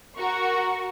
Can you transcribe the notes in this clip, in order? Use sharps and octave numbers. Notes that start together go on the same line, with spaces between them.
F#4 A#4 C#6